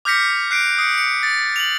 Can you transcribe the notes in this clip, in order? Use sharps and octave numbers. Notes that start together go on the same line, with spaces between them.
D6 F6 G6 A#6 B6 C#7
F#6 C7 D7
D#6 C7 C#7
C#7
A6
F7 F#7